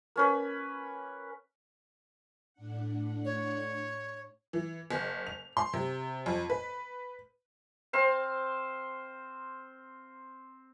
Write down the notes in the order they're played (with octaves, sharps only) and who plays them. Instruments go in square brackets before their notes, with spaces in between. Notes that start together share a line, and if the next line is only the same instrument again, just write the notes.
[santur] A#3 C#4 B4
[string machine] A2 D4 F#5
[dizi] C#5
[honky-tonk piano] E3
F#1
F7
C6
C3
F2
B4
[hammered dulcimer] C4 C5 F5